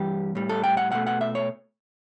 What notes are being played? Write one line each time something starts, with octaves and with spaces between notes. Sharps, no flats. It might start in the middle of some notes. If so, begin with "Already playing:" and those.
Already playing: G2 E3 G3 G4
A2 G3
A4
G5
F#5
B2 A3 F#5
F#5
E5
C#5